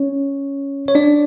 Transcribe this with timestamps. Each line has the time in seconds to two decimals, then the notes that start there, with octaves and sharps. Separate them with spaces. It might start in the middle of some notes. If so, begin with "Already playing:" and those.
Already playing: C#4 C#5
0.88 C#5
0.95 D4 D5